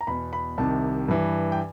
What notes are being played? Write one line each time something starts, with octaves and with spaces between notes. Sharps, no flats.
A#5
E2 B2 B5
B5
C2 C3 D#3 A5
G2 E3
G5